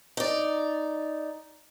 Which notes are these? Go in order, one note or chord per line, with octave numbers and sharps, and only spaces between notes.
D#4 D5